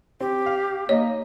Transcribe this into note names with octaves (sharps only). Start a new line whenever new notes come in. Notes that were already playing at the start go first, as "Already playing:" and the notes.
C4 G4
F5
A#3 D#4 C#5 D#5